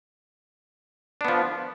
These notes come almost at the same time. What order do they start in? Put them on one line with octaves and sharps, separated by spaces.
D4 B3 F3